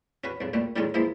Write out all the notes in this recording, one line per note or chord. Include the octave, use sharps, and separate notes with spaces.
C#4 F#4 B4
B1 C#3
A#2 G3 A3
A2 D3 D#3 F#3 G#3 C#4
E3 F3 G#3 A#3 E4